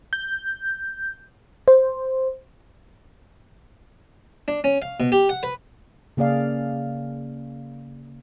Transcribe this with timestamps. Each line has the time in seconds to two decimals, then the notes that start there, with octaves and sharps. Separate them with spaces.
0.13 G6
1.68 C5
4.48 D4
4.64 C#4
4.82 F5
5.00 B2
5.12 G4
5.29 F#5
5.43 B4
6.17 C#3 A#3 G#4 D5 F5